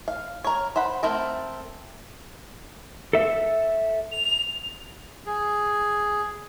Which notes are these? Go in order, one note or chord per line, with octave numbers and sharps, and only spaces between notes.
F5
A#4 C#5
C5 F#5 B5
A3 C4 A#4
A4 E5
F7
G#4